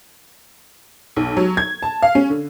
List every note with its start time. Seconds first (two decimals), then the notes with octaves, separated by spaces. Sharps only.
1.16 B1
1.37 F#3
1.57 G#6
1.82 A5
2.02 F5
2.15 C#4
2.30 D3